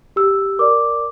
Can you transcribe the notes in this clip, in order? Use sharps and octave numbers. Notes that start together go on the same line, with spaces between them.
G4 E6
A#4 D5 D6